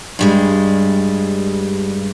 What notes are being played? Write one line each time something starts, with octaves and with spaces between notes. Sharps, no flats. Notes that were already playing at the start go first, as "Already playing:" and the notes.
G2 G3 G#3